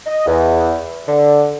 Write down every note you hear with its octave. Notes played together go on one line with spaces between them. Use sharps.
D#5
E2
D3